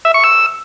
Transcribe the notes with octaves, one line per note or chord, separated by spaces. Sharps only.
E5
C#6
E6